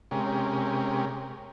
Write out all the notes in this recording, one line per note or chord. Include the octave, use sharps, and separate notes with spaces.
C3 G#3 C#4 G4 A#4